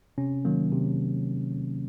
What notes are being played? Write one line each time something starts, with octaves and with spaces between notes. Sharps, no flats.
C3 C#4
D#3 F#3 A#3
C3